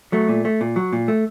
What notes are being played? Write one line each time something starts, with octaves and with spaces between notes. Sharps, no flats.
F#3 A3
A#2
A3
A#2
F#3
A#2
A3